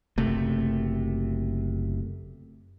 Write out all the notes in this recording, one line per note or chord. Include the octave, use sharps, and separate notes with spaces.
F#1 C3 A3